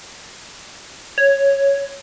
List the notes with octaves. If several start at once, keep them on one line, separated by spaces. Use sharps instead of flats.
C#5